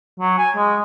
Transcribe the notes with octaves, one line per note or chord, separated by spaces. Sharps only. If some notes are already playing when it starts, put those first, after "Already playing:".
F#3
G#5
G#3